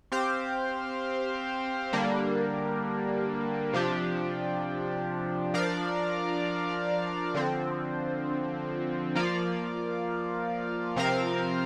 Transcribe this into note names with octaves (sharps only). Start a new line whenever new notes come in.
C4 G4 C5 F5
D3 G3 A#3 D4
C3 F3 D4 G4
F3 D4 A#4 D5 F5
D3 F3 C4
F3 A#3 F4 D5 F5
C3 F3 C4 A#4 F5